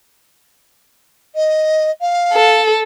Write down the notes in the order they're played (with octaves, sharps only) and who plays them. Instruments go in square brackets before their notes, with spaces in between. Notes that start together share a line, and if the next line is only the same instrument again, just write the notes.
[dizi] D#5
F5
[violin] A4